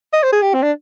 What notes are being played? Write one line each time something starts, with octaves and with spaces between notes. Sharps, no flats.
D#5
C5
G#4
G4
C4
D4